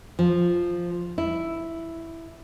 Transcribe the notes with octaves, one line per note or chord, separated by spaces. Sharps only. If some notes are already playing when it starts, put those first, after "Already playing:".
F3
E4